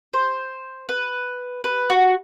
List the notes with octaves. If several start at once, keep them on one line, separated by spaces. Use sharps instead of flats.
C5
B4
B4
F#4